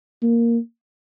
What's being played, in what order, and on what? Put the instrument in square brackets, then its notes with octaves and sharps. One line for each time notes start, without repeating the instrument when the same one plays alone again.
[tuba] A#3